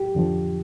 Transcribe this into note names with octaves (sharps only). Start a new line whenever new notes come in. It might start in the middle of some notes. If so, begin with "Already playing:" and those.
Already playing: G4
F2 D3 F3